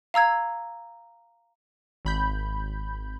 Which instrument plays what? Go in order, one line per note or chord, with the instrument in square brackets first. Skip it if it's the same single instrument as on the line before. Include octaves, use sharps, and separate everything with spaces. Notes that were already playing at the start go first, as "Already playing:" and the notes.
[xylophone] F5 A#5 E6 G#6
[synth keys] G#1 B5 G6